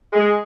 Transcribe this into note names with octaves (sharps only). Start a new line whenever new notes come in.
G#3